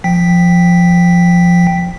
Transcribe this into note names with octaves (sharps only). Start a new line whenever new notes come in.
F3 G5 B6